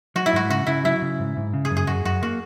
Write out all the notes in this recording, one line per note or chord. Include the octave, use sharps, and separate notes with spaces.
F#3 F#4
E4
G#2 F#4
C#3 F#4
C#3 E4
F#3 E4
C#3
G#2
G#2
C#3
G#4
F#2
G#4
F#2 F#4
F#2 F#4
A#3 F#4